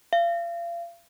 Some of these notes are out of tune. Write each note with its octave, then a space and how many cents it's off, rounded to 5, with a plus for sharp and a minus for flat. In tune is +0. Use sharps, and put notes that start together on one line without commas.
F5 -35